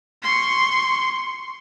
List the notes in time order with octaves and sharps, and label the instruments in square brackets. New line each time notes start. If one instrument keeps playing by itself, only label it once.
[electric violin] C6 C#6